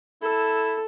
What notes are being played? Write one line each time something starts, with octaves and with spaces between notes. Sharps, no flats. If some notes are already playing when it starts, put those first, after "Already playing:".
E4 A4